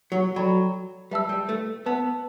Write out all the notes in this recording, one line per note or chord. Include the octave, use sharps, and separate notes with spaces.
F#3
F#3 A4 D5 G5 B5
G3 B4 E5 A5 E6
G3
A3
B3 B4 E5 A5 E6